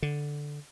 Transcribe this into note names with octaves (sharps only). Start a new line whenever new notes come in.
D3